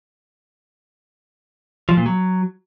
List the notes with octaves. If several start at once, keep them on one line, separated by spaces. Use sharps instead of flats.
F3
A#2
F#3